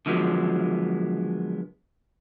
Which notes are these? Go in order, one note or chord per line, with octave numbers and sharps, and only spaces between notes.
D3 D#3 F3 F#3 G#3 B3